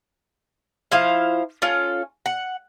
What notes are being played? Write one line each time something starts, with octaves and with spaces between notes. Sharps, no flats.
F3 E4 C5 F5
C#4 F4 A4
F#5